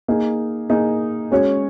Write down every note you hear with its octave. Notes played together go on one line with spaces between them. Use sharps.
A#3 D#4 G#4
A#3 D#4 G#4
G#3 C#4 F#4 C#5